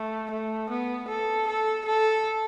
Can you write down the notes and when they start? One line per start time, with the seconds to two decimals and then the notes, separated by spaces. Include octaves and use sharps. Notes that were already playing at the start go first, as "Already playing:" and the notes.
Already playing: A3
0.31 A3
0.70 B3
1.08 A4
1.47 A4
1.85 A4